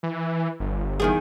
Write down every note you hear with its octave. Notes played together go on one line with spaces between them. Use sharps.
E3
G1
E2 D#3 G#4